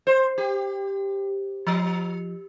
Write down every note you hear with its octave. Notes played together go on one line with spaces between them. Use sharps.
C5
G4
F3